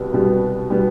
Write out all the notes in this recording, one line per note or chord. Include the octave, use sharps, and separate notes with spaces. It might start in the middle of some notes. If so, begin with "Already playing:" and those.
Already playing: C2 B2 G3 B3
C2 B2 G3 B3
B2 G3 B3